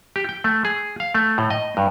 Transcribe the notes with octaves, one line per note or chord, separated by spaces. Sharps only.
G4
G5
A3
G#4
F5
A3
A2
D#5
G2